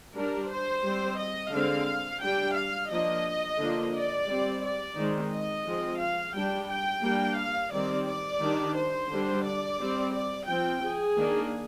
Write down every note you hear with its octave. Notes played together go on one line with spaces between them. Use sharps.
G3 D4 A#4
C5
G3 C4
D#5
D3 G#3 C4 F5
G3 D4 G5
F5
F3 A#3 D4 D#5
D3 F3 A#3 D4
D5
G3 C4
D5
D#3 G#3 C4
D#5
F3 G#3 C4
F5
G3 D4 G5
G5
G3 A#3 D4
F5
D#3 G3 C4 D5
D5
D#3 G3 D4
C5
D3 G3 D4
D5
G3 C4
D5
F3 C4 G5
G#4
D#3 A#3 D4